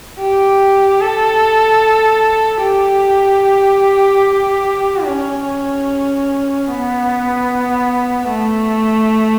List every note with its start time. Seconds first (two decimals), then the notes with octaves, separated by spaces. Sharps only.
0.19 G4
1.01 A4
2.62 G4
5.05 C#4
6.67 B3
8.29 A3